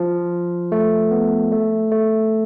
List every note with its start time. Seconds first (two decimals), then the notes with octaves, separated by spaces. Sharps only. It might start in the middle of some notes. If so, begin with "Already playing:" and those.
Already playing: F3
0.72 A3
1.11 B3
1.52 A3
1.91 A3